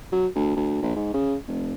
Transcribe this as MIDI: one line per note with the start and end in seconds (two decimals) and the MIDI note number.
0.12 0.27 54
0.35 0.56 38
0.56 0.81 38
0.82 0.92 34
0.96 1.11 44
1.14 1.35 49
1.48 1.74 29